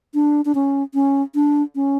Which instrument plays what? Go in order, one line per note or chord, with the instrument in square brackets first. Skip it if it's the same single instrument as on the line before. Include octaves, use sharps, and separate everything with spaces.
[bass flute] D4
D4
C#4
C#4
D4
C#4